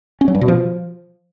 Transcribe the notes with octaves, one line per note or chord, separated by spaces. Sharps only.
C#4
F#3
G2
B2
F3